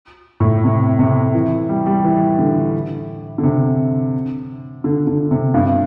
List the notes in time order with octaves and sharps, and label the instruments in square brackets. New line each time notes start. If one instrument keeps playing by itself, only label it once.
[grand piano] A2
C3
C3
E3
G3
G3
E3
D3
D3
C3
D3
D3
C3
G2